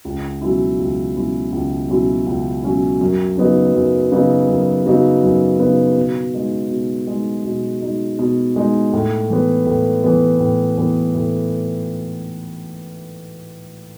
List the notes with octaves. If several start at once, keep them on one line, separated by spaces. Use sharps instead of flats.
C#2
B2 F#3 C#4 E4
C#2
B2 F#3 C#4 E4
C#2
B2 F#3 C#4 E4
C#2
B2 F#3 C#4 E4
F#2
C#3 F#3 B3 D#4
F#2
C#3 F#3 B3 D#4
F#2
C#3 F#3 B3 D#4
F#2
C#3 F#3 B3 D#4
B2
G#3 D#4
B2
G#3 D#4
B2
G#3 D#4
B2
G#3 D#4
A2
E3 B3
A2
E3 B3
A2
E3 B3
A2